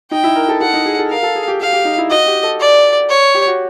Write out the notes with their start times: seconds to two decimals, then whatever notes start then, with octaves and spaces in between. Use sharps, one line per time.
0.11 D#4 G5
0.24 E4
0.36 A#4
0.49 A4
0.60 A4 F#5
0.74 D#4
0.86 G#4
0.98 A4
1.10 A#4 F5
1.23 A4
1.35 G#4
1.48 G4
1.60 G4 F5
1.73 G4
1.85 D#4
1.98 E4
2.10 F#4 D#5
2.26 G4
2.43 A4
2.60 D5
3.09 C#5
3.34 G4
3.47 F#4